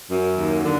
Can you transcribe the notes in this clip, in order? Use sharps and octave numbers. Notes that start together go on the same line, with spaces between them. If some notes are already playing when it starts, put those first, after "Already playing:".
F#2
D#2
D3